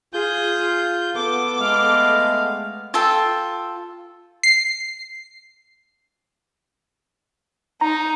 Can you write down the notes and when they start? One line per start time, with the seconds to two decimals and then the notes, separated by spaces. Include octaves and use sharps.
0.13 F4 G#4 G6
1.14 B3 A4 D6
1.60 G#3 A3 B3 F5
2.94 F4 A4 G5
4.43 C7
7.81 D#4 A#5